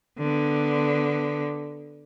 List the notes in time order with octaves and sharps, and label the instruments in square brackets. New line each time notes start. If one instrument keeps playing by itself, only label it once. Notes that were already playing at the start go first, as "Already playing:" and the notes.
[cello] D3 B3